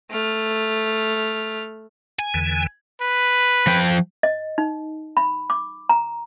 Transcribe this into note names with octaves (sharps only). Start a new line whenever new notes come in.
A3 F6
G#5
E2 D3 E3
B4
F3 G5
D#5
D#4
B5
D6
A#5